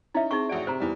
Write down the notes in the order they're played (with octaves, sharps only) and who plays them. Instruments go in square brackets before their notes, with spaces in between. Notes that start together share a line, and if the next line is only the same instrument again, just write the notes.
[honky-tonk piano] C#4 D#4 [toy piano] E4 E5
[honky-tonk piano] C4 [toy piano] D#4 G#4 C#6
[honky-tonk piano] A1 F#4 D7 [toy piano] D5
[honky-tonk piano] C3 [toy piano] C5 A#5
[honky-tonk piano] E2 G3